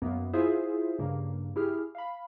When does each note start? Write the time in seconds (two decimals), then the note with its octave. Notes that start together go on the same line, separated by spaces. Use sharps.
0.02 F#2 A#3 B3
0.33 E4 F4 G#4 C5 E5
0.99 G2 C#3 A#3
1.56 E4 G4 G#4 F6
1.95 F5 B5